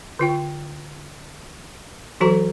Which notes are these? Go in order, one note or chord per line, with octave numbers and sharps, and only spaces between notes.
D3 F4 G5
E3 F#3 F#4 A4 A#5